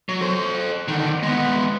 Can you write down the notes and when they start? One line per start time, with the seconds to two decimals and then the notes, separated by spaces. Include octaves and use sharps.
0.09 F#3
0.21 A4 C5
0.88 D3 D#3
1.23 G#3 B3